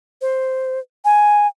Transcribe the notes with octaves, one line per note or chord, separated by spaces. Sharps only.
C5
G#5